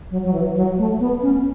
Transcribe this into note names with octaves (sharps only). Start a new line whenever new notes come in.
F#3
F#3
E3
F#3
A3
B3
C#4